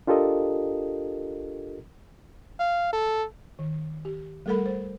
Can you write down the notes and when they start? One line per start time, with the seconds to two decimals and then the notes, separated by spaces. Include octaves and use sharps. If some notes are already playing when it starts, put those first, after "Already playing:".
0.07 D4 F4 G4 A4 A#4 D#5
2.59 F5
2.93 A4
3.59 D#3
4.05 G4
4.46 G3 A3 A4 A#4 F#5 B5
4.66 C5